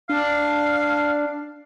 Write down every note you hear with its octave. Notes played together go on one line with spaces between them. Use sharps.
D4 F5